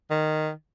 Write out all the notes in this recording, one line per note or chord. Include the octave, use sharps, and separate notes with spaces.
D#3